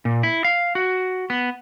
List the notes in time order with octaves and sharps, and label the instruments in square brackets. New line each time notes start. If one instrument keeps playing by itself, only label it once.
[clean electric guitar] A#2
E4
F5
F#4
B3